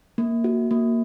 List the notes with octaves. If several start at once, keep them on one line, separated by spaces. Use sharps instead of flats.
A#3
F#4
A#3